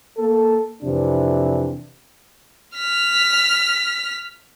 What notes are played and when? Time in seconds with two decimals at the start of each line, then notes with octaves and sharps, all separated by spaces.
0.18 A#3 A4
0.83 F2 C3 E3 D4
2.76 F6 B6